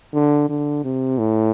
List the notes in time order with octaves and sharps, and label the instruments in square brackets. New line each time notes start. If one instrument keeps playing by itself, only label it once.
[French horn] D3
D3
C3
A2